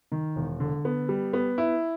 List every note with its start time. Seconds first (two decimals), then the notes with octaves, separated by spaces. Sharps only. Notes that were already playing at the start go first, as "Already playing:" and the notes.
0.12 D#3
0.36 E1
0.60 D3
0.85 B3
1.09 G3
1.33 B3
1.58 E4